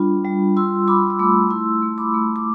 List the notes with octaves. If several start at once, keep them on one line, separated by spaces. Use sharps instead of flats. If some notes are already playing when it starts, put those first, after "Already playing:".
Already playing: G3 D4 F4 B5
G3
F4 C6 E6
F4 B5 D6
E6
A3 B5 D6
E4 C6 E6
A3
B5 D6
A3
D6